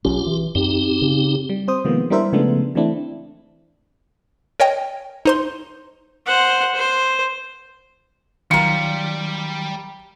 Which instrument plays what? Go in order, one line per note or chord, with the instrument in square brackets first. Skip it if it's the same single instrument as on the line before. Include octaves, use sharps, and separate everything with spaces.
[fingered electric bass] B1 F#3 C#4 [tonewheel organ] F4 G4
[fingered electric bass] E3
[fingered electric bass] F#2 [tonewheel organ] C4 D#4 G4
[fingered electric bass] C#3
[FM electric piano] G3
C4 C5 D#6
C3 D#3 F3 G#3 A#3 B3
G3 D4 E4 A#4 C5 E5
C#3 F3 G#3 A3 B3 D4
E3 A3 C4 D4 E4
[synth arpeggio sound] A#4 C#5 D#5 G5
D#4 C5 C6
[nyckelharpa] C5 F#5
C5
[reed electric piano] D#3 F#3 [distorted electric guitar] G3 [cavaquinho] F4 A#4 [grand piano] C#7